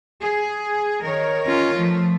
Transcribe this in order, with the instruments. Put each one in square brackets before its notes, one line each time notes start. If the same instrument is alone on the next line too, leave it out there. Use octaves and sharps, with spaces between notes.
[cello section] G#4
D#3 A#4 C#5
[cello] C#4 F4
[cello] F3 [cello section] A3